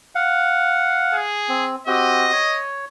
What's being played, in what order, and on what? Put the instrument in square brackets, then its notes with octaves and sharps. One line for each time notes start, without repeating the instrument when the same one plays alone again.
[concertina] F5 F#5
[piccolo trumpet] G#4
[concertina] C4
[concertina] C4 F#4 G4 [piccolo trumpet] D#5
[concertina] C#5